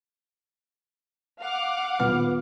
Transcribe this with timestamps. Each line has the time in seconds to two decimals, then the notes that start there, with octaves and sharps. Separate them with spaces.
1.41 F5 F#5 D6
2.00 D#1 B3 F6